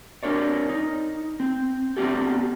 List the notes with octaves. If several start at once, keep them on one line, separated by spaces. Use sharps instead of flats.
C4 D4 A#4 C#5 D5
D#4
C4
B3 C4 D4 F#4 G4 A4